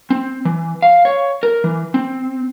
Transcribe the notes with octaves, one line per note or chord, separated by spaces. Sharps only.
C4
E3
F5
C#5
A#4
E3
C4